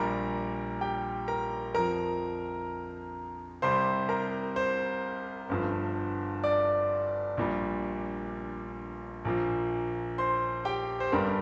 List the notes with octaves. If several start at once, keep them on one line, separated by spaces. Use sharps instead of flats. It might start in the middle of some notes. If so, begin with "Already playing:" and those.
Already playing: A#1 A#2 G3 A#4 A#5
G4 G5
A#4 A#5
F2 F3 A#4 A#5
C2 C3 G3 C5 C6
A#4 A#5
C5 C6
G1 G2 F3
D5 D6
A#1 A#2 G3
A#1 A#2 F3
C5 C6
G4 G5
C5
G1 G2 G3 A#4